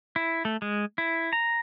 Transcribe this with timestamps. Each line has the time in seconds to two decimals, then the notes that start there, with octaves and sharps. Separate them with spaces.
0.16 E4
0.45 A3
0.62 G#3
0.98 E4
1.33 A#5